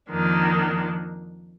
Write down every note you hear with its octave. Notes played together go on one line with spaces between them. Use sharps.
F2 D#3 A#3 D4